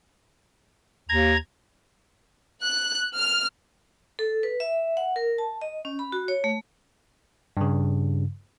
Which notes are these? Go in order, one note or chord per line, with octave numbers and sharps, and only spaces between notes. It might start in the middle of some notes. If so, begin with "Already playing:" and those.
D#2 A#5 G#6
F#6
F6
A4
B4
E5
F#5
A#4
A5
D#5
C#4
B5
F#4
C#5
A3
G2 C#3